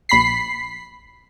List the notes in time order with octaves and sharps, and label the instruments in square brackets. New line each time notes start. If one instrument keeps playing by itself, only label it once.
[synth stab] A#1 B5 B6 C7